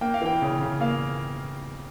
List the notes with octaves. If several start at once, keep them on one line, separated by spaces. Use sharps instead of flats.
A#3 G5
F5
E3 G5
C#3
C#3
A#3 F5